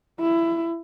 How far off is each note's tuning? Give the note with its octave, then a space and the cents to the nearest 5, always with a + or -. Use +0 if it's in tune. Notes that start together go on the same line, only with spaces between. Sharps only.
E4 +20